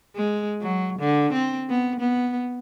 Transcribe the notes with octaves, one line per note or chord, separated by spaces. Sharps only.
G#3
F#3
D3
C4
B3
B3